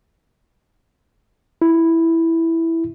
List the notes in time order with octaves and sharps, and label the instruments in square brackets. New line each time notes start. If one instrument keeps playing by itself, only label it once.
[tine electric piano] E4